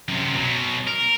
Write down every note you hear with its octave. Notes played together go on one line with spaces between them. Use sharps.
F#2 C3
B2 F#3
A#4